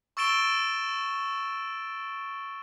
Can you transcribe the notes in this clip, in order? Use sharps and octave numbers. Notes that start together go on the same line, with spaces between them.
C#6 E6 A6 D7 E7 G7